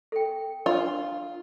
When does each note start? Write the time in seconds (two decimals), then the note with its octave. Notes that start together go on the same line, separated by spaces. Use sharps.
0.12 A4 G5
0.66 D4 F4